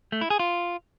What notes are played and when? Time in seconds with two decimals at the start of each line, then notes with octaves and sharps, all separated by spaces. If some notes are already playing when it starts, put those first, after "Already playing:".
0.12 A3
0.21 E4
0.30 G#4
0.40 F4